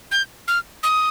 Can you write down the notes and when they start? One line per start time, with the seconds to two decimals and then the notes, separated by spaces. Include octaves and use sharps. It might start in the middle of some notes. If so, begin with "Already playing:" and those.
0.11 G6
0.48 F6
0.83 D#6